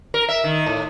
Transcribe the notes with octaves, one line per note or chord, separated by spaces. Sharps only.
A#4
E5
D#3
A2